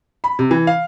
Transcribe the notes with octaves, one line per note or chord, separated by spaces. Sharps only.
B5
C3
E3
F5